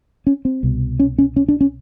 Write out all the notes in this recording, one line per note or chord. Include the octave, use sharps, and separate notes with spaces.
C#4
C4
C2 B2
C#4
C#4
C#4
D4
C#4